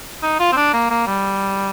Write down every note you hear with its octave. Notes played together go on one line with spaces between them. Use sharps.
D#4
F4
C4
D4
A#3
A#3
G3